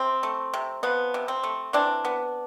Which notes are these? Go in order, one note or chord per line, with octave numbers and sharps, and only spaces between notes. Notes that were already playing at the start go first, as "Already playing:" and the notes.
Already playing: C3 C4
A3
C3
F3 B3
C3
C4
A3
E3 C4 D4
B3